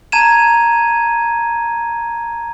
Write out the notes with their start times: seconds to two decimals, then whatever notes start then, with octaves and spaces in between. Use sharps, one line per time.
0.12 A5 A#5 G#6 D#7 E7